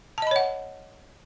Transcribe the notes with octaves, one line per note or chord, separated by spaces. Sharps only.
C#5 D#5 F#5 A5 B5